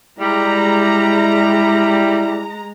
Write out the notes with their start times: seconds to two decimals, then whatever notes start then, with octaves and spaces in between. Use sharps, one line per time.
0.20 G3 G#3 E4 A#5